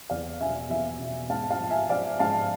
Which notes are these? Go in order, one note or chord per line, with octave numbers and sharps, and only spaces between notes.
E2 D5 F5
B2 E5 G#5
E2 E5 G#5
B2
G#2 F5 A5
F5 A5
F3
E5 G#5
F3 D5 F5
G#2 F5 A5